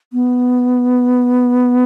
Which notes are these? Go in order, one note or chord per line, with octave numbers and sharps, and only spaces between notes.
B3